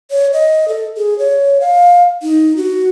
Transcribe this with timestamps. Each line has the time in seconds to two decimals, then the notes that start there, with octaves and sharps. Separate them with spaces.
0.11 C#5
0.33 D#5
0.68 A4
0.97 G#4
1.19 C#5
1.60 F5
2.22 D#4
2.57 F#4